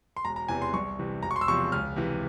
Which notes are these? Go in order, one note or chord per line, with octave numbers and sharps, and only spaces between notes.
C6
E1 A#5
A#5
E2 C3 E3 G#5
C6
C2 C#6
C3 E3
E1 A#5
C#6
C6
E6
E2 C3 F3 C#6
C#2 F6
C3 E3